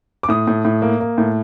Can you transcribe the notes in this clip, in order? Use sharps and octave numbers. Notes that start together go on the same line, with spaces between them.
D6
A2 D#6
A2
A2
A#3
A#3
A2